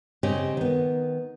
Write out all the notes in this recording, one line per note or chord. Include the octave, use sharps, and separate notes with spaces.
C#3 C4 G4 C#5 D#5
D#3 B3